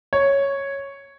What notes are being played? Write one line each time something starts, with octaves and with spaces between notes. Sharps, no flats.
C#5